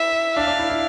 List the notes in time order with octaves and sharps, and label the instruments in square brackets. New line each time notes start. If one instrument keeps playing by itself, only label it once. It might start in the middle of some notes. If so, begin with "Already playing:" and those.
Already playing: [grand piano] E4 [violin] E5
[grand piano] D4 [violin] F5
[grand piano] D4
E4
E4